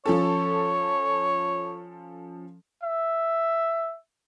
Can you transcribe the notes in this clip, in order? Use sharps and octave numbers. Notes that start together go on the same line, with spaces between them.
F3 C#4 A4 C#5
E5